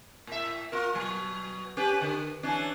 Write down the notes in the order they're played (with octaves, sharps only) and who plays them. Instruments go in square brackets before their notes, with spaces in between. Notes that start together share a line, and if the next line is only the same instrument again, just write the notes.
[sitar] A2 E5
F4 A#4
B2 F#3
C#4 G4 B4
D3
E3 C#4 D4